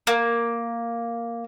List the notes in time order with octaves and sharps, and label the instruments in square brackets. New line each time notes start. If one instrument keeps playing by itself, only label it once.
[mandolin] A#3